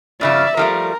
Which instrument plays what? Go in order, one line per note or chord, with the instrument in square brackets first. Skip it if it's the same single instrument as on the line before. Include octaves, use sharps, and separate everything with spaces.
[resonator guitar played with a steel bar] G2 C#3 F3 [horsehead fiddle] D5 E5
[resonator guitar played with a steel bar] F3 G3 A3 [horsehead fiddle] A#4